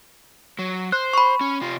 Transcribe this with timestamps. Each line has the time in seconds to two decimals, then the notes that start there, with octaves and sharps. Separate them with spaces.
0.59 F#3
0.92 C5 F#6
1.14 B5 C#6
1.41 C#4
1.61 C3 F4